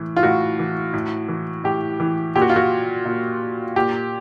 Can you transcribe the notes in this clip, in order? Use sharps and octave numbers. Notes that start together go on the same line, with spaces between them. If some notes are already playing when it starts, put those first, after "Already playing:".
Already playing: A2 E3
F4
A2 F#4
E3
A2
E3
A2 G4
E3
A#2 G4
F#4
F4
F#4
A#2
A#2 G4